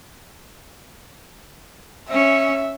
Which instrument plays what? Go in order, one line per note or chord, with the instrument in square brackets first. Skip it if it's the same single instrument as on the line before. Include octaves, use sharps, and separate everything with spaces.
[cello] C#4 [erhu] E5